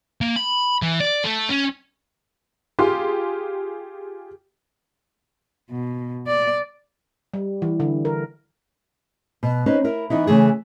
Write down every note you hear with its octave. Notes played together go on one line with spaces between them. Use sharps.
A#3
B5
E3
D5
A3
C#4
F4 G4 G#4 C6
B2
D5
G3
E3
D3
A#4
B2
C4 C#4 D#4 B4
E4 A#4
E3 B3 D#4 E4
C#3 E3 A3 G#4